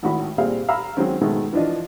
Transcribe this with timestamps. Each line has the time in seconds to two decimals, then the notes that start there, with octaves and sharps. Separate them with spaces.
0.03 G#1 A2 D#3 F#4 B5
0.38 A#2 G3 C4 G#4 F5
0.69 F5 A#5 B5 E6
0.97 D#3 F#3 G#3 C4 C#4
1.21 G#2 B2 D#3 G#3 A3
1.53 E3 F3 D4 F4 D#5